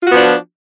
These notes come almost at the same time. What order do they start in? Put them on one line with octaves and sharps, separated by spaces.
F4 F#4 B3 F3 D4